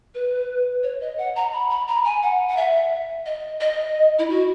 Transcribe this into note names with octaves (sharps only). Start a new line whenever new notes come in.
B4
C#5
D#5
F#5
A#5
B5
B5
A#5
G#5
F#5
F#5
E5
D#5
D#5
E4
F#4